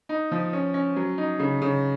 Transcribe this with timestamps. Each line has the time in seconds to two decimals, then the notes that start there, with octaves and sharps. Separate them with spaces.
0.09 D#4
0.32 F3
0.53 C#4
0.74 C#4
0.96 F#3
1.18 D#4
1.40 C#3
1.62 C#3